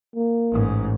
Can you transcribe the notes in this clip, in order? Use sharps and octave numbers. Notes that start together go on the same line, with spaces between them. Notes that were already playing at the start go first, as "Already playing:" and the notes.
A#3
A1 G#2